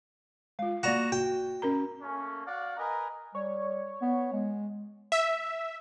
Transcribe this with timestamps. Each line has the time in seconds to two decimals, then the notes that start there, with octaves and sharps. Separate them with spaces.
0.59 G#3 F4 F5
0.83 A#3 F#4 D5 A#5 E7
1.12 F#4 G5
1.62 C#4 A#4 A#5
2.01 A3 A#3 C#4
2.47 F#4 D5 F5 F#5
2.77 A#4 B4 D#5 G#5 A#5
3.35 G3 C#5
4.02 B3
4.32 G#3
5.12 E5